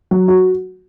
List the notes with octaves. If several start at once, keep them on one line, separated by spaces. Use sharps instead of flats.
F#3
F#4